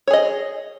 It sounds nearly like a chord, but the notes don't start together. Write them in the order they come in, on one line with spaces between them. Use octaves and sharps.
C#5 G#4 D#5